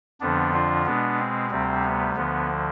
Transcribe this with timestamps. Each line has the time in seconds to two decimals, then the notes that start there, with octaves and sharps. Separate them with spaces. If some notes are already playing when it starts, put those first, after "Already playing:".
0.21 F2 D3 F3 B3 D4
0.53 D4 F4
0.86 B2 G#3 B3 D4
1.19 C4
1.51 D2 C3 G3 C4
1.84 B3
2.15 D2 D3 F3 B3